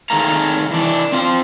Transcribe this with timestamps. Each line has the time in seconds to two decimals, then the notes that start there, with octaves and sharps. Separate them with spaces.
0.10 D#3 A3 G#4 A4 F5 A#5
0.70 E3 D4
1.12 C4 F4 C5